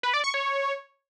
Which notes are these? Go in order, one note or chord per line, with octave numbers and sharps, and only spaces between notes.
B4
D5
C#6
C#5